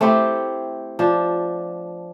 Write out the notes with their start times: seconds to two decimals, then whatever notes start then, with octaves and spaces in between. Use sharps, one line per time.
0.01 A3 C4 E4 G4
0.99 F3 D4